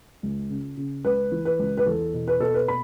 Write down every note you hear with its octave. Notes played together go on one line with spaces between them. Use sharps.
C#2
C#3
C#3
C#2 B4
E3
B4
C#2
B4
E2 A4
B2
B4
B2 A4
B4
B5